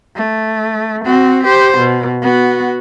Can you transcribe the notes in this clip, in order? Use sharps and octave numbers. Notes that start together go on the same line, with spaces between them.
A3
C4 F#4
G4 C5
B2
B3 F#4